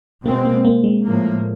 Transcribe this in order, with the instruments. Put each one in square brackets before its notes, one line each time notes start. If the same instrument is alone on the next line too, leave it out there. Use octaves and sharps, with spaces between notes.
[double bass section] B2 G#3 C4 [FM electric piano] A#3
[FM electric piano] A#3
A#3
G#3
[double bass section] A2 F3 A#3